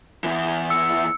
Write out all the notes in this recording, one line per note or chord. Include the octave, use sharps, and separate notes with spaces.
E2 E3
E6 C#7